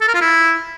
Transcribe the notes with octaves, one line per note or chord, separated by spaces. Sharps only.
A4
A#4
F4
E4